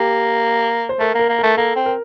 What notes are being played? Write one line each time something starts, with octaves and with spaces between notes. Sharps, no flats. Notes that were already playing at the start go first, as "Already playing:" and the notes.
Already playing: A#3 G4
C5
A3 A#4
A#3 A#4
A#3
A3 A#4
A#3 A4
C4
A#4